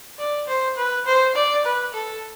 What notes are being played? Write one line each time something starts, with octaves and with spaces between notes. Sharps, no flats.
D5
C5
B4
C5
D5
B4
A4